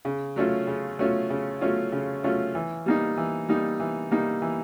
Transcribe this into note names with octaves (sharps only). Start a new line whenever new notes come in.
C#3
F#3 A3 C#4 F4
C#3
F#3 A3 C#4 F4
C#3
F#3 A3 C#4 F4
C#3
F#3 A3 C#4 F4
E3
G3 A#3 D#4
E3
G3 A#3 D#4
E3
G3 A#3 D#4
E3